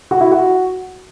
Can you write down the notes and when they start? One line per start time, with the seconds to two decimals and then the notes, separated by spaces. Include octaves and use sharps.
0.11 F#4
0.21 E4
0.31 F#4